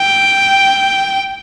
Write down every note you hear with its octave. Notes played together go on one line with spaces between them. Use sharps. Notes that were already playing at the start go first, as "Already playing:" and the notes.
Already playing: G5